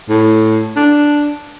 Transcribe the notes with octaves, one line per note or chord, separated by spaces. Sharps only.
A2
D4